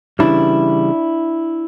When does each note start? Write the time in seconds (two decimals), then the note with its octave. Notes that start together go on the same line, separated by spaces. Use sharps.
0.19 C#3 E3 G3 D4 E4